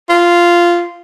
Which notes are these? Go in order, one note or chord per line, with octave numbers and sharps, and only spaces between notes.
F4